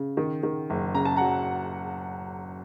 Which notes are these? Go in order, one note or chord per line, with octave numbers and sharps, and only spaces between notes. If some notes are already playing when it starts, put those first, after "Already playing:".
Already playing: C#3
D#3
D#3
F#1
C#3 A#5
A5
F#3 F#5 A#5